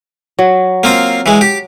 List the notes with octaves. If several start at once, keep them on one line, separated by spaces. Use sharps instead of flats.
F#3
A#3 C4 F4
E3 G#3
G4